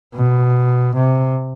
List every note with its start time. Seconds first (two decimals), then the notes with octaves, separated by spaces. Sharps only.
0.15 B2
0.95 C3